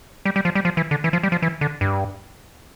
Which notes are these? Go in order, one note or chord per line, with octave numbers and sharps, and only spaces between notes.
G3
G3
F3
G3
F3
E3
D3
E3
F3
G3
F3
E3
D3
G2